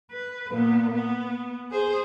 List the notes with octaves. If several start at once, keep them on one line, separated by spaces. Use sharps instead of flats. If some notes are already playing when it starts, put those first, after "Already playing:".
B4
A#2 B3
B3
G#4 C5